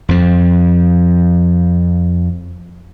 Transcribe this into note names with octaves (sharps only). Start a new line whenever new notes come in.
F2 F3